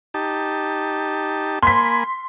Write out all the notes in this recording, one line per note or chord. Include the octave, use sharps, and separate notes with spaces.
D#4 G4 A5
A#3 G#5 B5 C6 B6